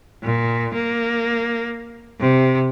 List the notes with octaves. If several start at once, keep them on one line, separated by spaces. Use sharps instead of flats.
A#2
A#3
C3